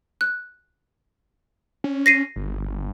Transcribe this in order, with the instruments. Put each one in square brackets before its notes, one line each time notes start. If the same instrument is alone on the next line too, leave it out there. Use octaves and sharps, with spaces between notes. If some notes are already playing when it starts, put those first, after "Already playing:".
[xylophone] F#6
[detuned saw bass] C#4
[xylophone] A#6 C7 D#7
[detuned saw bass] G1